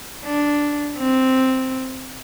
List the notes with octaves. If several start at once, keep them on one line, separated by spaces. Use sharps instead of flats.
D4
C4